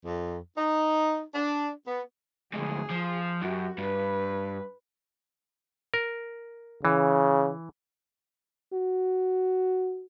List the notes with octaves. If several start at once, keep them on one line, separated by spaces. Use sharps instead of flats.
F2
D#4
D4
B3
D2 G#2 G#4
F3
F#2 F#4 G4
G2 B4
A#4
C#3 E3
F#4